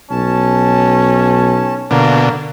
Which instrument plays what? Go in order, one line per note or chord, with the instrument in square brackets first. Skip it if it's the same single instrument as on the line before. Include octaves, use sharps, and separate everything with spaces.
[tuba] B1 [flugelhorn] C#4 [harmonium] A5
[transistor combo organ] B2 D3 [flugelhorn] A#3